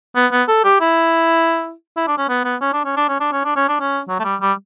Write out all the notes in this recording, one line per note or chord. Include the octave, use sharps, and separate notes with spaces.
B3
B3
A4
G4
E4
E4
D4
C#4
B3
B3
C#4
D4
C#4
D4
C#4
D4
C#4
D4
C#4
D4
C#4
F#3
A3
G3
G3